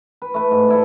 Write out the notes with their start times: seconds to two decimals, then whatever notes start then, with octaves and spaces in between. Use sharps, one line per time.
0.22 B4
0.34 A3 B4
0.51 G#2
0.68 D4 E4 A4